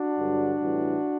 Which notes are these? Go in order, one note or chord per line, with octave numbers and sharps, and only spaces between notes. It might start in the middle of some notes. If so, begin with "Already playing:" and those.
Already playing: D4 F#4
G2 D3 F#3
A2 E3 G3